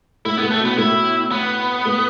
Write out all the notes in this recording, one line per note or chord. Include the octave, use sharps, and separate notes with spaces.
A2 E4
B3
A2
A3
B2 B3
A2 E4
B3
A2